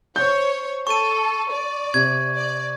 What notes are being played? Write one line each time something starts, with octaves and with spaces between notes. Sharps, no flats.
C5 C#5 G6
A4 C#6 D#7
D5
C3 G#6
D5